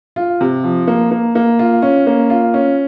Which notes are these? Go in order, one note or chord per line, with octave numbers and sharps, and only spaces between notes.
F4
C3
F3
A#3
A#3
A#3
F4
C#4
A#3
F4
C#4